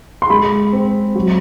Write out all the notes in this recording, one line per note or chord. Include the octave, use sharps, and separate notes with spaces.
C6
G#3 B5
C4
F#3